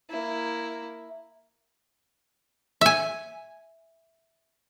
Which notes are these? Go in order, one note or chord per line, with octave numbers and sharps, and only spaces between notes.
A#3 E4
E5 G#5